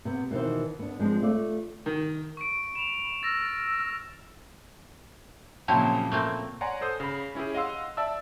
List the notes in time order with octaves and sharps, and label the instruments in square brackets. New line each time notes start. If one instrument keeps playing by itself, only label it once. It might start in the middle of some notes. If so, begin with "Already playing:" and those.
[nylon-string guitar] C3 B3
B2 D#3 E3 C5
B3 D4
F3 G#3 C4 D4
A3 F4 D5
[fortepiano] D#3
[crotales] C#6 D7
[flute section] B5 [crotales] E7 F7
[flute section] E6 F6 [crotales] A6 A#6
[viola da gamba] A#2 C#3 F3 [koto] F#3 C4 E4 [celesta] G5 A5
[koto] A3 A#3 C4
[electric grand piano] C#5 D5 F#5 G#5 A#5 C6
A4 C5 D#6
C#3 B5
C#4 E4 G4 G#4
D#5 F5 F#5 C6 E6
D5 E5 A5 E6